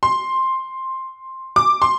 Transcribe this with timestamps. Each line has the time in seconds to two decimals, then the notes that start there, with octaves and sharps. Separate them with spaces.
0.03 C6
1.56 D6
1.82 C6